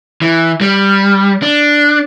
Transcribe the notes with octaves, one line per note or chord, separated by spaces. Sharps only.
E3
G3
D4